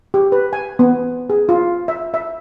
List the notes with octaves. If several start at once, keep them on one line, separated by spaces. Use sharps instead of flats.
G4
B4
G#5
B3
G#4
F4
E5
E5